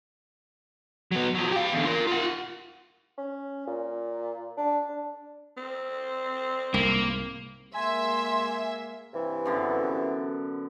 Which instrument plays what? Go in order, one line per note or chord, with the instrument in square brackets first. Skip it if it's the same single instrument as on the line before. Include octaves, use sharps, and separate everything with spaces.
[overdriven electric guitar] F#3 B3
F3 F#3
G4 F5
E2 D3
F4 A#4
F4 F#5
[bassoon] C#4
A#2
D4
D4
[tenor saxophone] C4
[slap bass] C2 G#2 [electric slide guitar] A#3
[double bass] G#3 A#3 [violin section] E5 [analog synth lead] G#5 [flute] C6
[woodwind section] G2 C3 E3
[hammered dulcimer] F#2 D3 B3